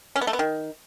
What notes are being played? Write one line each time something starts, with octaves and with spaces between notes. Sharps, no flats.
C#4
B3
A3
B3
D#3